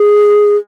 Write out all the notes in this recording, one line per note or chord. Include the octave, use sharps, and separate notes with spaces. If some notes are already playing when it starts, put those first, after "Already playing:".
Already playing: G#4